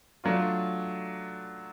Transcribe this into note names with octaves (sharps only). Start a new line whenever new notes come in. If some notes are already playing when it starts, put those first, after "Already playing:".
F#3 A3 D4 F4